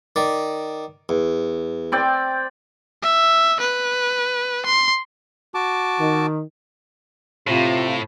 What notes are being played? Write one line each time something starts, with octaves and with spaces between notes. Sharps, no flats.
D#3 D5
E2
C4 D5 G5
E5
B4
C6
F#4 A5 D6
D#3
A2 C3 F4